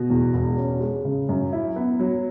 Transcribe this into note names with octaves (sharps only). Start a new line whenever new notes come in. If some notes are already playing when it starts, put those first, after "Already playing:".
Already playing: B2
E2
E1
C#4
G#3
C#3
F#2
E4
B3
F#3